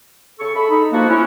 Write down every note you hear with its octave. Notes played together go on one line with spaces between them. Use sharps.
C#3 A4 C#6
A4 B5
D#4
F3 A#3 D4 F#4
C#4 E4